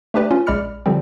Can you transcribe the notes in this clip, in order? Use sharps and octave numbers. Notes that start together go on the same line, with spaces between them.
A3 D4 G4 B4 D5
C#4 F4
A#1 G#3 D5 B5 F6 C#7
D3 F3 G3 C4